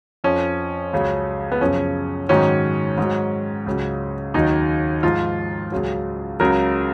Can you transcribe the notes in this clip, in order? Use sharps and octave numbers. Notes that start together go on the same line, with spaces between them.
F2 F3 C#4
C#2 C#3 F#3
B3
F#2 C#3 F3 C#4
G#2 D#3 F#3 C#4
G#2 F#3
C#2 C#3 F#3
D#2 D#3 F#3 D#4
G#2 F3 F4
C#2 C#3 F#3
C#2 C#3 F#3 A#4